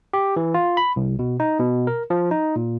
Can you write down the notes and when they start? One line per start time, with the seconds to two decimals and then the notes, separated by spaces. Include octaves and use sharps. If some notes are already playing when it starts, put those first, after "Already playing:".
0.13 G4
0.36 E3
0.54 F4
0.77 B5
0.96 C2
1.19 B2
1.40 D#4
1.59 B2
1.87 A#4
2.10 F3
2.31 D#4
2.56 A#2